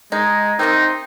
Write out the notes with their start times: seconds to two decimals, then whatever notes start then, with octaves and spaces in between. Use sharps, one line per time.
0.12 G#3 D#4
0.59 C3 A#3 C4 D#4